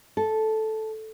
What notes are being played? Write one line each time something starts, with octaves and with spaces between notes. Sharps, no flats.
A4